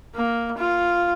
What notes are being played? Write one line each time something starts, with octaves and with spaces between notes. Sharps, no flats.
A#3
F4